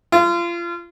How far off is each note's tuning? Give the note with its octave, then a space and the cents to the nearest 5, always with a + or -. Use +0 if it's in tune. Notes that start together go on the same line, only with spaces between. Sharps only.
F4 -30